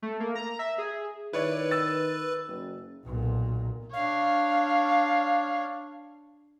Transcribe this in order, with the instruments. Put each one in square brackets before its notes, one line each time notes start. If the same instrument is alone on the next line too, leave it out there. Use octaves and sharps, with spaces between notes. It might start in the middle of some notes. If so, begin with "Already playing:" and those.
[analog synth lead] A3
A#3
A#5
E5
G#4
[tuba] D#3 [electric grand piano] E4 C#5 D5 [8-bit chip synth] B4
[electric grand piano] E6 A6
[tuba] F#1
[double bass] B1 A#2
[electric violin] D4 C#5 [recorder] F5